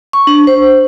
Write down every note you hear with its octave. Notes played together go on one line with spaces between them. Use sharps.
C#6
D4
C5